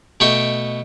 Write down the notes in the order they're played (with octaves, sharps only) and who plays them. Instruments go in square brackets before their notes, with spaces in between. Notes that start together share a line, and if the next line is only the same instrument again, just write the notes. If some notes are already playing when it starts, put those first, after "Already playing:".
[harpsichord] B2 A3 D#5 G5 C#6